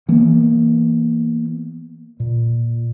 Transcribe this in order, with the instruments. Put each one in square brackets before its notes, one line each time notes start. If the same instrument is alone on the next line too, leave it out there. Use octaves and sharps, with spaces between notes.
[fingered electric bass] E3 A#3 B3
A#2